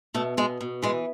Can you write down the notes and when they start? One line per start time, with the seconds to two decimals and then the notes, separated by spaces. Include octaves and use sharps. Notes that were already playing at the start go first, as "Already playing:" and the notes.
0.14 B2 A3
0.37 B2 G#3
0.61 B2
0.82 E3 G#3